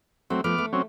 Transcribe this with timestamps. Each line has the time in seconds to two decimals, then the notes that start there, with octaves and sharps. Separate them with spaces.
0.30 F#3 A3 C4
0.44 F3 A3 B3 D6 F6
0.58 A3
0.73 F#3 C4 C#4